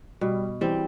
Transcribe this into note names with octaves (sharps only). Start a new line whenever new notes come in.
B2 G3
E3 G3 C4